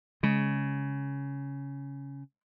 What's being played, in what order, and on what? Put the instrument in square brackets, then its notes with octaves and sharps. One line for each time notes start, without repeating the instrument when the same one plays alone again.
[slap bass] C#3 [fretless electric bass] G#3